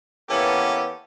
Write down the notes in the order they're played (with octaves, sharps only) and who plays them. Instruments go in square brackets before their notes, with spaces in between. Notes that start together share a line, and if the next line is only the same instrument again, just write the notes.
[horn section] E3 A#3 B3 C#4 G4 A4